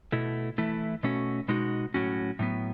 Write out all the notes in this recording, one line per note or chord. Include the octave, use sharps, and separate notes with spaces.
B2 A3 E4
E3 A3 E4
B2 A3 C#4 F#4
B2 G#3 D#4 F#4
A2 F#3 C#4 F#4
A2 F#3 B3